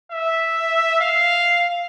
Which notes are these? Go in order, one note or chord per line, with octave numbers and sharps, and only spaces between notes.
E5
F5